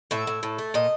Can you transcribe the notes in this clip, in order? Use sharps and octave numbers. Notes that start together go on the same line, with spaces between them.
A2 E5
A2
A2
A3
A#2 D#5